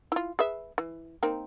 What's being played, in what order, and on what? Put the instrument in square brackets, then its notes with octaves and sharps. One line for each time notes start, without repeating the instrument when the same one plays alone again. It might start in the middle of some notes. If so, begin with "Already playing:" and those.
[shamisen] E4 F4
G#4 B4 E5
E3
A#3 C4 D#4